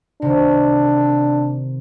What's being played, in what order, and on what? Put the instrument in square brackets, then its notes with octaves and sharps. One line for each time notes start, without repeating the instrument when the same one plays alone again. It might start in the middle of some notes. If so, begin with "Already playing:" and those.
[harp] C3 D#3 [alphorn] D4